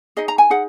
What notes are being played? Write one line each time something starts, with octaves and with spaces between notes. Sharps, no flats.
D#4 G#4 D#5
A#5
G#5
D#4 G#4 F#5